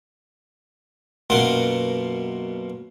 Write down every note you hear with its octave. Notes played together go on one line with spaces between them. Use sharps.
F#2 B2 A#3 F4 F#5 C6